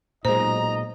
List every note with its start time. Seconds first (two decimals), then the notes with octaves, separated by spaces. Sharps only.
0.25 B1 A#2 G#3 D#4 C5 D#5 A#5